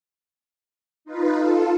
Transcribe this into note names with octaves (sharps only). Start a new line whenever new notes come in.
D#4 F4 B4
F4 A4